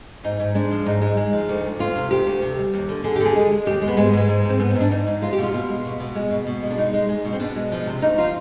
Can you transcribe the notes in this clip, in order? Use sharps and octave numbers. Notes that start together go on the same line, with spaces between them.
G#2 D#4
G#2
G#3 D4
F3
G#2 D#4
G#3
G#3
F3
D2
D2
D2 F4
C3
D2 G4
D2
C3
G3
D#2
D3
D3 G#4
G4
D3
G#4
G#3
G#3
D#2 G4
G#3
B3
G#2 G#3
B3
G#2 G#3
G#2
G#2 C4
G#2 B3
C4
G#2
D4
G#2 D#4
G#2
G#3 F4
G4
B2
F4
B2
G#3
B2
B2
G#3
B2
B2
G#3
D4
G#3 D#4
G#3
G#3
B2
C4
B2 D4
G#3
F3
C3
D2 D#4
F3 F4